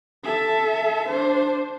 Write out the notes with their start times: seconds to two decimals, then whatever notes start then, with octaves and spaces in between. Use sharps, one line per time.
0.25 A4 E5
1.08 D4 C5